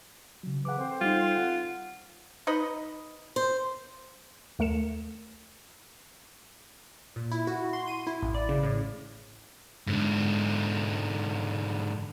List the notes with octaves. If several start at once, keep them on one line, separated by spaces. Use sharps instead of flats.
C#3 F#3
C#3 E3 B4 F#5 D6
C4 A4 C5
G3 D#4 F4
F#5
D#4 B4 D#5
C5
D#2 A3 A#4 C#7 E7
A#2
E4
F#4
C6
D#7
E4
A1
D5
C#3
A2
G#2 D3